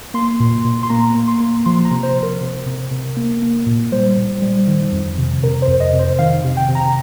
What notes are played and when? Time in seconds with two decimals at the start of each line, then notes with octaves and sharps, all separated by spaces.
0.14 A#3 C6
0.40 A#2
0.65 A#2
0.83 C6
0.90 A#3 A#5
1.15 A#3
1.28 C6
1.40 A#3
1.66 F3 C6
1.85 A#5
1.91 C3
2.03 C5
2.15 C3
2.23 A#4
2.41 C3
2.66 C3
2.91 C3
3.17 A#3
3.42 A#3
3.66 A#2
3.92 G3 C5
4.17 A#2
4.42 G3
4.67 D#3
4.92 F2
5.18 C3
5.43 C3 A#4
5.62 C5
5.68 F2
5.80 D#5
5.93 C3
5.99 C5
6.19 D#3 F5
6.44 C3
6.57 G5
6.69 C3
6.75 A#5